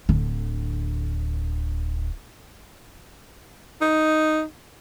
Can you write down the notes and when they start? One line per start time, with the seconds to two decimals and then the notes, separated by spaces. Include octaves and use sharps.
0.09 D1 D3
3.81 D#4